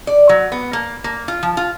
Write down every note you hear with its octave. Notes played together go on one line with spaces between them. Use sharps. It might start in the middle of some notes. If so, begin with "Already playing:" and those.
D5
F#3
B3
A#3
A#3
F4
F3
F4